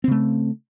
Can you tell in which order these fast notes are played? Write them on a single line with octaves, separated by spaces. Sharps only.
C4 C#3 A3